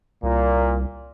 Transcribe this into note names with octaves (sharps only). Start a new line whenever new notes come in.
C2 A#2